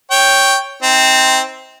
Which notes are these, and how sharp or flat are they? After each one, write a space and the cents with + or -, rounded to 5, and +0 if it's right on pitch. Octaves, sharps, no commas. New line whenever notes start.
C#5 +0 G5 +0
C4 +0 D#4 +35